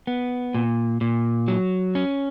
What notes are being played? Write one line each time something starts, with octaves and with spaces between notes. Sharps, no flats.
B3
A#2
A#2
F#3
C#4